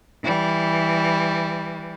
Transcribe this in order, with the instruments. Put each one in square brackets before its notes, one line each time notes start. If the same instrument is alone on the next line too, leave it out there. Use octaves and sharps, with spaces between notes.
[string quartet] E3 G3